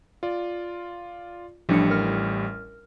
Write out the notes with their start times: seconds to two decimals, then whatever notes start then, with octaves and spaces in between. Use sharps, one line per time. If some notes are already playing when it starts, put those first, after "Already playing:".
0.23 F4 D5
1.69 A1 A2 F3 G3 D4 C#7
1.90 A#4 F6